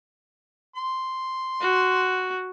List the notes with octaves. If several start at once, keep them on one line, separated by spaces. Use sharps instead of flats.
C6
F#4